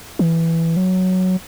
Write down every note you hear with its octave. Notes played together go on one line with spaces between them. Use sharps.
E3
F#3